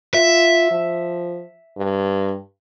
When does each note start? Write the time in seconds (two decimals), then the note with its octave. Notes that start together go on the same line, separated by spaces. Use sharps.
0.14 F4 E5
0.71 F3
1.77 G2